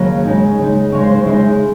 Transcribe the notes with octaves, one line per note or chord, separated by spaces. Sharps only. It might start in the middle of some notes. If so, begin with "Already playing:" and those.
Already playing: D#2 C#3 F#3 D#5
C#3 G#3 D#4
C#3 G#3 D#4
C#3 G#3 D#4 C#5
C5
C5
C#3 G#3 D#4 E4